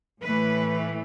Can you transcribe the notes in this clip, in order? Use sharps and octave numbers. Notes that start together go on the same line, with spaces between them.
A2 E3 A3 B4